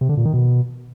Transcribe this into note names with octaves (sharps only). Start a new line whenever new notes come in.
C3
D3
A#2
D#3
B2